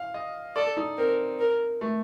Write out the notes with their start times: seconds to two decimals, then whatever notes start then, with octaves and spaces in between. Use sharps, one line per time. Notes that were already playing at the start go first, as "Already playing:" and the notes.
Already playing: F5
0.14 D#5
0.56 A4 D5
0.77 D#4
0.98 C4 A#4
1.39 A#4
1.81 A3